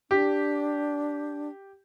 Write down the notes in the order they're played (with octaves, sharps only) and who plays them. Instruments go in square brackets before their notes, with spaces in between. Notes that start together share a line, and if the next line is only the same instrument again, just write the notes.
[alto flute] D4 [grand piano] G4